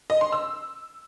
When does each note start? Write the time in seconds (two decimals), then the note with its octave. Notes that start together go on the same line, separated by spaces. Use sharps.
0.10 D#5
0.21 C6
0.32 E6